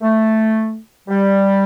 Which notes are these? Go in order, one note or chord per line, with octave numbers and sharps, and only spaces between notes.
A3
G3